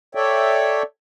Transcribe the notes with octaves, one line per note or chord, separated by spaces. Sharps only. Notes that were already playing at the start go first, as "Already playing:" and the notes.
A4 C#5 D5 E5 G5